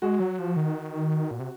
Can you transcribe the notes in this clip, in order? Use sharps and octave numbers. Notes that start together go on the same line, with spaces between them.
G#3 F#4
F#3
F3
D#3
A#2
C3